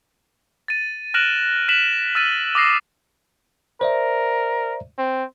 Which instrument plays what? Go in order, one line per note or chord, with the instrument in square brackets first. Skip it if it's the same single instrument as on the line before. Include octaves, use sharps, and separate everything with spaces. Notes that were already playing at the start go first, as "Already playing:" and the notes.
[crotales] A6 D#7
F6 F#6 A#6 D7 E7 F#7
F#6 B6 E7 F#7
E6 F6 A6 D#7
D6 D#6 A#6 C7
[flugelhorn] A#4 [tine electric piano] C5 D5 E5
[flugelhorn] C4